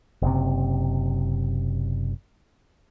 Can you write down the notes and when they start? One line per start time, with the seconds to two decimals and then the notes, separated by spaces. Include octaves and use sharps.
0.22 F#1 C3